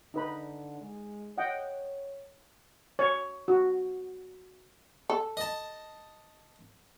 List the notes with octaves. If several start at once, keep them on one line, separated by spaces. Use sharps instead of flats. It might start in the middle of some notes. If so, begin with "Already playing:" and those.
D3 D#4 B4 B5
G#3
C#5 D#5 F#5 G5
C#5
F#4
A4
D#5 A5